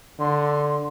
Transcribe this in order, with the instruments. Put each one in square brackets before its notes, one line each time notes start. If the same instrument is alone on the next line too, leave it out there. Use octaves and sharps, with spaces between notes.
[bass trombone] D3 [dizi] C6